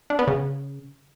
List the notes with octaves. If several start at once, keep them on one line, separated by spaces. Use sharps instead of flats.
D4
B3
C#3